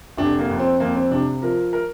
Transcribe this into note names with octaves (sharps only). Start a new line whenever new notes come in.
F1 D4
A#3
F2
C4
F2 A#3
C4
C3 D4
F3 A#4
A#4